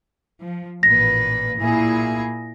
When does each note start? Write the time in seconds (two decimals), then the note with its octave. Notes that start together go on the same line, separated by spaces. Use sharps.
0.41 F3
0.83 A1 A#2 B4 A#6
1.58 A#2 E4 G#4